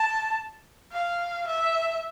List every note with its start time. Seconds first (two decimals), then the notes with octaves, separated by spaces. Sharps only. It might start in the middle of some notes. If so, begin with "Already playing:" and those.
Already playing: A5
0.92 F5
1.47 E5